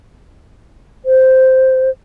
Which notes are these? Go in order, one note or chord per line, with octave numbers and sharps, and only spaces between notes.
C5